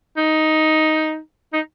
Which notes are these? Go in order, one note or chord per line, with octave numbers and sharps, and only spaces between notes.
D#4
D#4